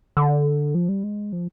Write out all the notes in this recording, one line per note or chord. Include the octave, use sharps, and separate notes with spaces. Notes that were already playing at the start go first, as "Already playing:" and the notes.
D3
F3
G3
G#3
F3